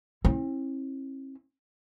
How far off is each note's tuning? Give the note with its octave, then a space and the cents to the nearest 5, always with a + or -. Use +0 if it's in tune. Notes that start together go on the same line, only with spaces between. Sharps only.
C4 +45 E4 -15